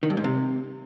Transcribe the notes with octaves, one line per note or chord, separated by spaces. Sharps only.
D#3
G2
G#2
C3